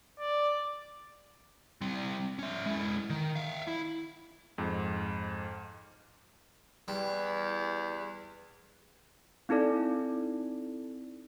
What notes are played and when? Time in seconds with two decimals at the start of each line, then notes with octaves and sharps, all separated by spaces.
0.19 D5
1.81 G3 C4
2.39 C#4 E5
2.66 G#3 E4
3.10 D#3
3.36 E5 F5
3.67 E4
4.58 F2 G#2
6.88 E2 G3
9.49 C4 D#4 E4 A4 D5